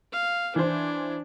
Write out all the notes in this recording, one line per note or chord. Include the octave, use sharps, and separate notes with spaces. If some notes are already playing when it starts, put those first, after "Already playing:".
F5
E3 D4 C5